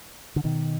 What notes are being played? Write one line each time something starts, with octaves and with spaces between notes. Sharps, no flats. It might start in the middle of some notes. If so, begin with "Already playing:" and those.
D3
B2 D#3